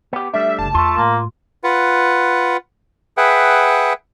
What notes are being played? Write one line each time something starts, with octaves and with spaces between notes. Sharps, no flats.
B3 G4
G3 A3 D4 E5
F#1 C#2 A5
E2 A3 F4 C6
A2 A#3
F4 B4 F#5
G#4 B4 E5 F#5 G5